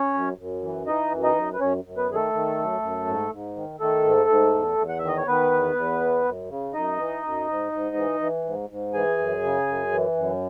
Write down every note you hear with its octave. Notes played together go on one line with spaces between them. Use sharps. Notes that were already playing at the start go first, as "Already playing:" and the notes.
Already playing: C#4 C#5
F#2
F#2
E3
E3 D#4 D#5
F#2
D#4 D#5
F#2
B4
F#2 C#4 C#5
F#2
B3 B4
D#3 G#4
A3 A4
D#3
F#2
F#2
G#2
G#2
D#3
D#3 A3 A4
G#2
G#2
E2
E2
F#5
D#3 E5
D#5
C#5
D#3 B3 B4
E2
E2
E3
F#2
C#3
F#2 D#4 D#5
E3
F#2
G#2
G#2
E3
E3
G#2
G#2
E3 G#4 G#5
F#2
C#3
F#2
E3
F#2